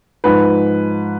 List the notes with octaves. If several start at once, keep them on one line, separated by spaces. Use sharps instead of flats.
G#2 F3 B4